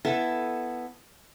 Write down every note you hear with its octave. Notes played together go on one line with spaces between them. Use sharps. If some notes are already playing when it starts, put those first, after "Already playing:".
B3 E4 A4